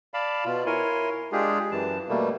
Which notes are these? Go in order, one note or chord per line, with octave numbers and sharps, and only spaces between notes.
D5 F5 A5 B5
B2 F4
E4 A#4 C#5 G#5 C6
G#3 D4 F4 G4 G#4
F#2 E3 A5
B2 G3 A3 A#3